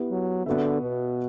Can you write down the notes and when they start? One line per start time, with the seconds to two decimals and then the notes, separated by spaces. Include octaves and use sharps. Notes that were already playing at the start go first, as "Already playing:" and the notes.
Already playing: B3 E4 G4 B4
0.11 F#3
0.46 D3 B3 F#4 B4 E5
0.82 B2